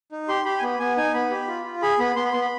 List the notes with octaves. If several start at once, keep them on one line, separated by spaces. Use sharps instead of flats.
D#4
G4 C6
G4 B5
G#5
B3 B5
B3 G#5
D#4 G#5
B3 B5
G4
F4
F4
G#4 B5
B3 B5
B3 C6
B5
B3 C6
B5